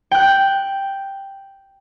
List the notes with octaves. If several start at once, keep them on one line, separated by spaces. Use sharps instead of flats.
G5 F#6